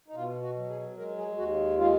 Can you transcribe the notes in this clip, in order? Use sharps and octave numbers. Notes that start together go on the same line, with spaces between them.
D#4
B2 F4
F#4
F#3
G#4
G#3 A#4
G#4
D#2 F#4
G#3 F4